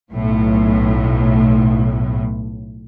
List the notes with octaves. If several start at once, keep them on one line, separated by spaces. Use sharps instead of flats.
B1 A2